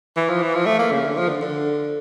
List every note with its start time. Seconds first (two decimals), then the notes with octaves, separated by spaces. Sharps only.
0.16 E3
0.29 F3
0.42 E3
0.55 F3
0.66 A3
0.79 A#3
0.91 C#3
1.04 D3
1.17 F3
1.29 D3
1.41 D3